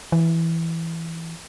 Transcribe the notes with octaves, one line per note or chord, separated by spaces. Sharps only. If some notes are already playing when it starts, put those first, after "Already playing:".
E3